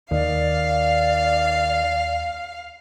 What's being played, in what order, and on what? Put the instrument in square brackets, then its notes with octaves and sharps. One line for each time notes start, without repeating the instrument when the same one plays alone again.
[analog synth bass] D#2 [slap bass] D#3 [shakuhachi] D5 [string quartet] F5